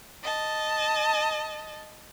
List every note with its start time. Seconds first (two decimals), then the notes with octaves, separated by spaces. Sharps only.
0.23 D#5 A5